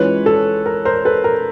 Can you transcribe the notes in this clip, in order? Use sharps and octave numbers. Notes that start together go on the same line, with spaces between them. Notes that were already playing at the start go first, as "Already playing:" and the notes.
Already playing: E3 G#3 C#4 F4 B4 C#5
A4
A#4
A#4 C5
A4 B4
A#4